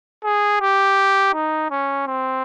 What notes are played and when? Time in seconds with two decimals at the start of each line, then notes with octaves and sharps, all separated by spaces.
0.24 G#4
0.61 G4
1.34 D#4
1.71 C#4
2.08 C4